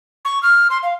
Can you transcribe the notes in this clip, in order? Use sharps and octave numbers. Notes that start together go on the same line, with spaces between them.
C#6
F6
C6
F5